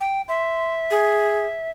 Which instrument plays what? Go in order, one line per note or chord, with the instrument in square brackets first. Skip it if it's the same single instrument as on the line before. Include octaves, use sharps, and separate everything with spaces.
[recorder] G5
[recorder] E5 [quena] C6
[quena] G#4